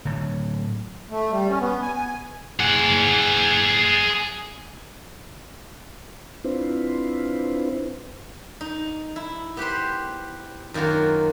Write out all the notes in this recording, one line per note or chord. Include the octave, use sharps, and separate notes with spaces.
A2 D3 F#3
A3
G3
C#4
B3
G#5
G#5
G#4 F#5
C4 D4 E4 F4 B4 C5
D#4
E4
B3 G4 B4 C5
F#2 D#3 A#3 F4 F#4